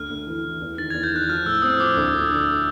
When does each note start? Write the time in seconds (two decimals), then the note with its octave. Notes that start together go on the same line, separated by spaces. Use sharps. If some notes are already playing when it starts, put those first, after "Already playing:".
Already playing: D2 F6
0.10 D2
0.27 E3
0.45 E3
0.62 E2
0.78 D#3 A6
0.90 E2 G#6
1.03 G6
1.12 D#3 F#6
1.29 F3 F6
1.46 A2 E6
1.62 C4 D#6
1.79 F3 D6
1.97 D2
2.14 D3
2.31 D3